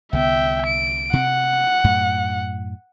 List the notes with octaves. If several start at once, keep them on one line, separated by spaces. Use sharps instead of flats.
C2 D3 B3 E5 G5
D7
C3 C4 F#5
F#2 A2